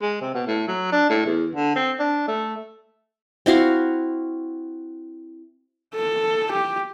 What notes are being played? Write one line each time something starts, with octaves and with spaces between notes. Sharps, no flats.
G#3
C3
B2
A2
F#3
D4
A2
E2
D3
C4
D4
A3
C4 E4 F#4 F5
A4
G4